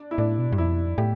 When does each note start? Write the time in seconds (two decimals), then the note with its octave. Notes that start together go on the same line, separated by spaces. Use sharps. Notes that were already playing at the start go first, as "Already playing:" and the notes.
Already playing: D4
0.11 E4
0.18 A2 D4
0.38 B2
0.53 G2
0.58 F2 E4
0.98 A2 G4